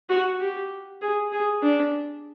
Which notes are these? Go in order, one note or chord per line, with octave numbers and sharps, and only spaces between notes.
F#4
G4
G#4
G#4
D4